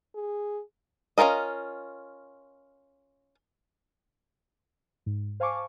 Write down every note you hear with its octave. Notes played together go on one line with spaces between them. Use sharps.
G#4
C#4 D4 F4 A#4 D#5
G#2
C5 F5 G#5 A5 C#6 D6